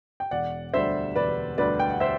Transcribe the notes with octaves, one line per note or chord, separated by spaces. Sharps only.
G5
E1 D5 F#5
D2 D3 G3 D4 C5 E5
E1 B4 D5
D2 D3 G3 D4 B4 D5
G5
F#5
C5 E5